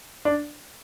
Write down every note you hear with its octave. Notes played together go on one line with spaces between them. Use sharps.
D4